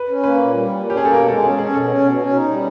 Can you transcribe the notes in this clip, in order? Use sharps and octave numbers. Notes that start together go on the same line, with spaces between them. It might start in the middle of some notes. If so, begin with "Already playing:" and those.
Already playing: B4
C#4
A#3 B4
A#2
G3
A#2
C#4
G4
A#3 G#4
A4
B2 A#4
G#3 A4
C#4 G#4
C#4 G#4
B2 A4
C#4
B2
C#4
D#4
G3